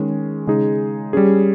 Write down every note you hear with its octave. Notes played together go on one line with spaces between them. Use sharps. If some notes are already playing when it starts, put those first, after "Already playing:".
Already playing: D#3 G#3 C#4 G#4
C#3 G#3 D#4 G#4
G3 C#4 G#4